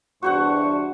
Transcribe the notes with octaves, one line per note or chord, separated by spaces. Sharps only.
E2 G2 D4 F#4 C5 F#5 C#6